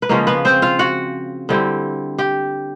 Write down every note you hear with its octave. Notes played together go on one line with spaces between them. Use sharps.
B4
C#3 F3 G#3 A#3 C#4 A#4
B3 B4
C4 C5
F4 F5
F#4 F#5
D3 G3 C4 E4
G4 G5